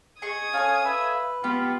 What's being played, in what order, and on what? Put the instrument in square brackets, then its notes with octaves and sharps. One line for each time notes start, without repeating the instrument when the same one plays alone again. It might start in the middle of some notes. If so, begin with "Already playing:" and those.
[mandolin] G#4 D#5 C#6 [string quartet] D#6 G#6
[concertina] C#4 F5 [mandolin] F4 A4 C#5
[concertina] B4 [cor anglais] E5
[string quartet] B3 [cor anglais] F4 [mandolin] G4